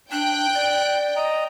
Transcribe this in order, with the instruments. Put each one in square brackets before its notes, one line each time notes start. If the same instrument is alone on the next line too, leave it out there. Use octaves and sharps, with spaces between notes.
[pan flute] D4 [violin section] G5 [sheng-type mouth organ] F#6
[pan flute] D5
[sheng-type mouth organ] D#5 A#5